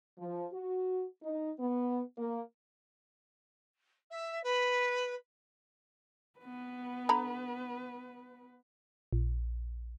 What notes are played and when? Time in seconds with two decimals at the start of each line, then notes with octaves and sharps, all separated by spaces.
0.19 F3
0.53 F#4
1.23 D#4
1.60 B3
2.18 A#3
4.10 E5
4.43 B4
6.39 B3 B4
7.09 D3 A#5 B5
9.13 A#1